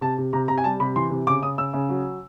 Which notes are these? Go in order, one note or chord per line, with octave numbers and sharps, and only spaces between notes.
C3 A5
C3
C3 A#5
C3 A#5
G#5
G3 A5
C3 B5
E3 C6
C3
C#3 D6
C#3 D#6
C#3 E6
C#3
F#3